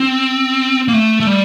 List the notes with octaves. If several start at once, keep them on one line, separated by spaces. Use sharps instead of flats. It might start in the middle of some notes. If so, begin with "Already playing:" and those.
Already playing: C4
A#3
A3
A3
G3